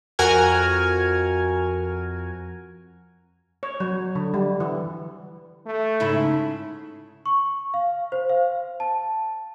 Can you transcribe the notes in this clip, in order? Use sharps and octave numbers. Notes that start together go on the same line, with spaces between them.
F2 F#4 A#4 G#5 F6 G#6
C#5
F#3
D3
G3
E3
A3
G#2 C#3 E4
C#6
F5
C5
F5
A5